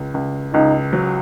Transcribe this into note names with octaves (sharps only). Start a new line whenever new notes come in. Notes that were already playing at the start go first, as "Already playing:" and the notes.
Already playing: C#2
C#2
C#2 D#4
F#3